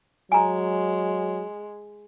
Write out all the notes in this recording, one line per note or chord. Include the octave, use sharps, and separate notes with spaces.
F#3 G#3 G#5 A#5